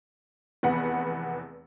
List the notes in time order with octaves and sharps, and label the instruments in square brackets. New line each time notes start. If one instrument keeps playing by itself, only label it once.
[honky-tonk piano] F1 E2 B3 F#5 B5